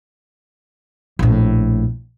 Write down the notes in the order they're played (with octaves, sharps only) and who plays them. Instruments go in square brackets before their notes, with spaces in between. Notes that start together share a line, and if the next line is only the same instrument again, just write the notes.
[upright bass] A#1 A2